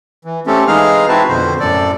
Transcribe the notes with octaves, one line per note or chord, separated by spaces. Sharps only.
E3
A3 C4 C#4 G4 A4
E3 G#3 D#4 G#4 F5 F6
C4 E4 F#4 B4 A5
F2 B2 D3 C5
F#2 A2 A4 D5